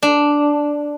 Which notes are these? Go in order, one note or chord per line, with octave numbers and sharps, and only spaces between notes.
D4